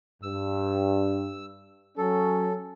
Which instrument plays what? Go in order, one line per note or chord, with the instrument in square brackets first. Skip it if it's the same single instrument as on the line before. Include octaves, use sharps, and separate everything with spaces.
[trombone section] G2 [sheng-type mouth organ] E6
[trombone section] F#3 C#4 [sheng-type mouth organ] A4